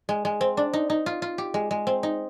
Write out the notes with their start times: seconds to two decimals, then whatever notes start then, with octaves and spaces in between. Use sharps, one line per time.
0.09 G#3
0.25 G#3
0.41 C4
0.57 D4
0.73 D#4
0.90 D#4
1.06 F4
1.22 F4
1.38 G4
1.54 G#3
1.71 G#3
1.87 C4
2.03 D#4